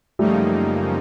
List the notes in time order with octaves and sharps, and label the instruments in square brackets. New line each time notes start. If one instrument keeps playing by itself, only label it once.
[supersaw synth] F#2 C#3 F3 A#3 D#4 [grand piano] G3 A3